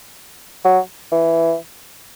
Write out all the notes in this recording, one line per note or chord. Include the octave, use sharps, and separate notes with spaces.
F#3
E3